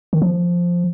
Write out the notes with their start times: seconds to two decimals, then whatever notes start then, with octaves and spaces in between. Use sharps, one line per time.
0.13 D#3
0.22 F3